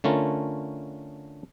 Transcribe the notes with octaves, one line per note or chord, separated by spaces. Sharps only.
D3 A3 C#4 F4 A#4